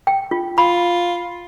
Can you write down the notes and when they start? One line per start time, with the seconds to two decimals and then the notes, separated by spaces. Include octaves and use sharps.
0.07 G5
0.31 F4
0.58 F4 B5